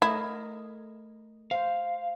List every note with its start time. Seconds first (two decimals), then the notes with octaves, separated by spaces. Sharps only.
0.02 A3 E4 A#4 D#5
1.51 C5 F5